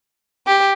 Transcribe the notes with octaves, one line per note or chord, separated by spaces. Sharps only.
G4